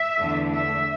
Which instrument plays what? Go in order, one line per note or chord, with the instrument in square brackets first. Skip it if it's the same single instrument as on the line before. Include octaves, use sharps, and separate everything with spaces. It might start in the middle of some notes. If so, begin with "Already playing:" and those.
Already playing: [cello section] E5
E2 D3 A3 D4
E5